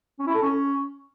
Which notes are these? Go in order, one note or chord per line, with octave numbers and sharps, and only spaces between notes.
C#4
E4
A4
C#4